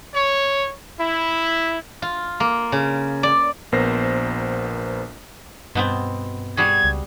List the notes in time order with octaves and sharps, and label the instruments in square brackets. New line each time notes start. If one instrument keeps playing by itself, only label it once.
[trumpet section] C#5
E4
[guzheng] F4
A#3
C#3
D5
[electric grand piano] A#1 B3 A#4 C5 A#6 C7
[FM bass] G2 [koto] B2 B3 C4
[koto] G3 F#4 G#4 [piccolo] G#6
[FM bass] C#2